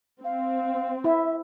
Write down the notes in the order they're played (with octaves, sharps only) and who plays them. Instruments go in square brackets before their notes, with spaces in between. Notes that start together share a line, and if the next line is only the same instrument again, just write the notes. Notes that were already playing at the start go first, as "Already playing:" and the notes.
[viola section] C4 [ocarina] F5
[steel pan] E4 [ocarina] E5